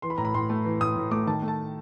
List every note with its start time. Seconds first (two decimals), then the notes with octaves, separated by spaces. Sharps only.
0.02 E3 C6
0.10 B5
0.18 A2 A#5
0.25 B5
0.34 A2 C6
0.50 A3
0.65 E3
0.80 A2 D#6
0.96 A2
1.11 A3 D6
1.27 D#3 A5
1.42 A3
1.48 A5